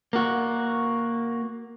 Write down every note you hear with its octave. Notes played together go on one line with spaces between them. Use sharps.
A#3 F#4